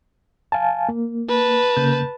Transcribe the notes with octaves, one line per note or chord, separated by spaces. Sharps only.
F5 G#5 A5
A#3
B4 A5
C#3 A#3 G6